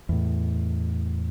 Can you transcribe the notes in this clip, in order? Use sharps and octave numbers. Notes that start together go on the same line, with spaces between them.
E2 A2